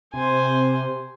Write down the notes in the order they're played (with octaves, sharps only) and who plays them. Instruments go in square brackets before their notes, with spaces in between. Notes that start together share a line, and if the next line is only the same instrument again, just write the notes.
[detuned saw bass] C3 [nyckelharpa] C5 G#5